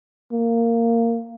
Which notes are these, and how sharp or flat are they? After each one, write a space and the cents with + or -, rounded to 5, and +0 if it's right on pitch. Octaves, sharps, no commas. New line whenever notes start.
A#3 -15